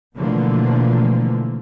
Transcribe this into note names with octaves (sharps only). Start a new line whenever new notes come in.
B2 D3 E3 F3 A3 A#3